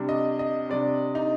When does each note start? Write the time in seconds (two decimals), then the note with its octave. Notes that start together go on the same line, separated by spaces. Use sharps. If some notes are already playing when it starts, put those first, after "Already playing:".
Already playing: C3 G3 D4
0.09 D#5
0.39 D#5
0.69 C3 G3 D4 D5
1.15 D#4